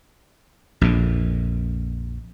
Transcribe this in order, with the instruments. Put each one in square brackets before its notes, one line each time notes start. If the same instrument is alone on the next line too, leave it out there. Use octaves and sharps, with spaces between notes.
[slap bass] A#1 F2 A#2